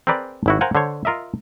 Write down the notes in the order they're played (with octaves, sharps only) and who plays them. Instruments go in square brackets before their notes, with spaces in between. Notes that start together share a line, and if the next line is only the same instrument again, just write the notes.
[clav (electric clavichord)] C4 G#4 A#4 B4 D5
G#1 E4 F#4
A#4 C5 F5 F#5 G#5
D3 C5 C#5
F4 A#4 D#5 E5